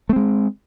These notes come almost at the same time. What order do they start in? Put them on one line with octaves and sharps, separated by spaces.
A3 C4 G#3